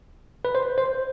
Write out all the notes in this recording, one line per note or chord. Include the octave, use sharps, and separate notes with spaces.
B4
C5
C5